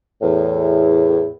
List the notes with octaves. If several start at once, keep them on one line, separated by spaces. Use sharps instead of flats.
E2 A2